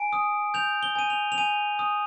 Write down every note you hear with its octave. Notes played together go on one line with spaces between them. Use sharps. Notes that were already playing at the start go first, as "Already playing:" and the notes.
Already playing: G#5 D7
D#6
G6 F7
G7
G#5 D#7
F7
F7
G#5 D#7
D#6